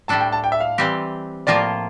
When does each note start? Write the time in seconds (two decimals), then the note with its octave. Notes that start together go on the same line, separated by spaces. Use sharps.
0.08 A2 G3 D4 A4 A5
0.21 G5
0.32 A5
0.44 G5
0.52 E5
0.60 F5
0.78 E3 G3 C4 G4
1.47 A2 F3 A#3 F4 D5